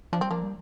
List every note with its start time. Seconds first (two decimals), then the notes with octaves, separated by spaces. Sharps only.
0.13 F3 D4
0.21 G3 C4
0.30 F3 A#3 D4
0.43 G3